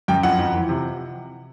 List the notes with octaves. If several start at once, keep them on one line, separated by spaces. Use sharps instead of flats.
F#2 G5
F2 F#5
F2
E3
C3